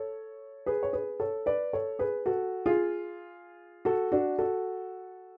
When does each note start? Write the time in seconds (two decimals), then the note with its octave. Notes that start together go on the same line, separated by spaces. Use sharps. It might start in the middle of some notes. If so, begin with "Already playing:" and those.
Already playing: A4 C#5
0.66 G#4 B4
0.83 C#5
0.93 G#4 B4
1.20 A4 C#5
1.46 B4 D5
1.73 A4 C#5
1.99 G#4 B4
2.26 F#4 A4
2.66 F4 G#4
3.85 F#4 A4
4.12 D4 F#4
4.38 F#4 A4